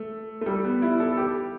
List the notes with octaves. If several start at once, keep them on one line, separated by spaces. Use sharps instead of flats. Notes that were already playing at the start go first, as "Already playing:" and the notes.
Already playing: A3
A3
G3
B3
E4
A4
A4
G4